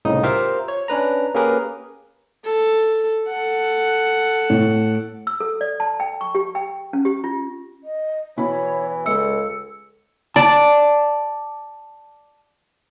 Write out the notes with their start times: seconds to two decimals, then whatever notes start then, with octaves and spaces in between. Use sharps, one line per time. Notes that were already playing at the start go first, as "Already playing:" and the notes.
0.05 C2 A2 C#3 D#4 D#6
0.23 F4 G4 A#4 C5 E5 F5
0.68 C#5
0.88 C#4 D4 B4 A#5
1.34 A#3 C#4 G4 G#4 A#4 B4
2.45 A4
3.28 A4 F#5
4.50 A2
5.27 E6
5.40 A4
5.61 D5
5.80 A5
6.00 G5
6.21 C#6
6.35 G4
6.55 G5
6.93 C#4
7.05 G4
7.24 F4
7.83 D#5
8.37 B2 E3 E4 C#5 B5
9.06 C#2 G#3 A4 D#5 E6 C#7
10.36 D5 A5